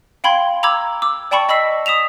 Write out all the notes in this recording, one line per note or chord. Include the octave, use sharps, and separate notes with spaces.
F5 G5 B5 C6 G#6
A#5 B5 D6 E6 G#6
D6 E6
D5 G5 A5 B5 C#6 C#7
D#5 B5 E6 B6 C7
D#6 B6 E7 F7